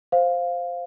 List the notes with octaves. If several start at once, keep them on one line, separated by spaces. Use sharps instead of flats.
C5 F5